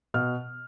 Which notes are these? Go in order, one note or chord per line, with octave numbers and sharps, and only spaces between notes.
B2 F6